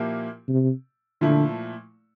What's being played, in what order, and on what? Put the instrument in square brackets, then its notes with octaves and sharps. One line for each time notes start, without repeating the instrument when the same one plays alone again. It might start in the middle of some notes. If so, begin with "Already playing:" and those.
Already playing: [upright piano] A#2 F3 A#3 E4 G4
[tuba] C3
[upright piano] A#2 F3 A3 E4 [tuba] D3